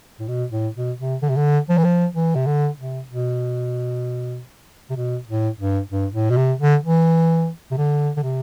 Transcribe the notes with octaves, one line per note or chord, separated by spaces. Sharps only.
A2
B2
A2
B2
C3
D3
C3
D3
F3
E3
F3
E3
C3
D3
C3
B2
C3
B2
A2
G2
G2
A2
B2
C3
D3
E3
C3
D3
D3
C3